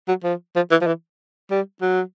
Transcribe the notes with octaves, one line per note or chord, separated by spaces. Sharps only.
F#3
F3
F3
E3
F3
E3
G3
F#3